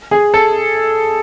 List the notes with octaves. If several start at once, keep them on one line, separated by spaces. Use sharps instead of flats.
G#4
A4